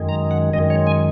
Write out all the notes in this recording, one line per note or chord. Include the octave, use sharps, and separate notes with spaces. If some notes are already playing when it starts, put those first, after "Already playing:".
Already playing: F#2 D#3 G#3
A#5
F#5
F#2 D#3 G#3 D#5
C#5
G#5